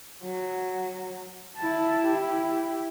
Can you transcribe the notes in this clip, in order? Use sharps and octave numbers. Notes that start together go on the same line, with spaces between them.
F#3
E4 A5
E4 G4